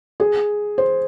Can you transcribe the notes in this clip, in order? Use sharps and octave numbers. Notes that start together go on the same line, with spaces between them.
G#4
C5